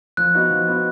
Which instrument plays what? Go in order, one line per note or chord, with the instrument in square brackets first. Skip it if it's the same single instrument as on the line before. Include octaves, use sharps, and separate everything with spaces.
[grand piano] F3 [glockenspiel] F#6
[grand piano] B3 D#4 F#4
F3
B3 D#4 F#4